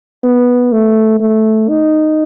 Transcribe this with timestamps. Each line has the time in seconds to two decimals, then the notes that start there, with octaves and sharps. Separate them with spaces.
0.24 B3
0.72 A3
1.20 A3
1.69 D#4